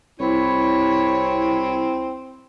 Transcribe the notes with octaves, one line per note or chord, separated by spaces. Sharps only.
C2 C4 E4 C#5